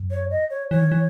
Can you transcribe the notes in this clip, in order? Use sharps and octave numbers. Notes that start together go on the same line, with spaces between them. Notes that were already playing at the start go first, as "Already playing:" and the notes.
Already playing: F#2
C#5
D#5
C#5
E3 C#5
D#3
E3